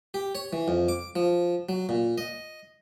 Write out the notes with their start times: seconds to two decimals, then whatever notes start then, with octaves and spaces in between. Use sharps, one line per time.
0.14 G4
0.35 C#5
0.53 E3
0.68 F2
0.88 D6
1.16 F3
1.69 F#3
1.89 A#2
2.18 D#5